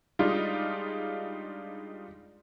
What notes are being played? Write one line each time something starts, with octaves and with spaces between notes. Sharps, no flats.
G3 G#3 D4 D#4 F4